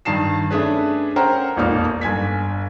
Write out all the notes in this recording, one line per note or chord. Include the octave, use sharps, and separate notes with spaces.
G2 D#3 A5 C7 E7
A3 C#4 D4 G#4 B4
C#4 A#4 C5 F#5 G5
E1 A#1 F2 A#3 D#4 F6
G1 G#5 G#6 B6